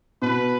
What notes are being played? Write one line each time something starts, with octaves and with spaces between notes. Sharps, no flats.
B2 B4